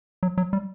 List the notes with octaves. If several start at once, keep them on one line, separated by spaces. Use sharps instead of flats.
F#3
F#3
G3